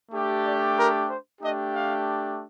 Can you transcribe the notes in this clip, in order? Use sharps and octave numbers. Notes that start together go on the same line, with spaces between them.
A3 D4 G4
D5
A#4
C5
A3 D4 G4 D#5
F5